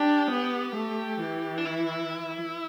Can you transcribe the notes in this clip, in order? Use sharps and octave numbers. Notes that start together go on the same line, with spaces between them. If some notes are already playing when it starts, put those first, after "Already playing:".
Already playing: D4 G4
B3
A3
E3
D4
E4